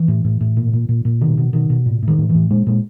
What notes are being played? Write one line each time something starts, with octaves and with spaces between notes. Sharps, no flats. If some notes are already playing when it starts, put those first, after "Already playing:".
Already playing: E3
A2
A2
A2
A#2
A#2
A#2
A#2
B2 D#3
B2
B2 D#3
B2
A2
A2
D#3
A2
E3
A2
A#2 G#3
A#2 G#3